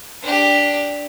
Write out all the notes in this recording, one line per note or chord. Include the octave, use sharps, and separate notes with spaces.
D4 G4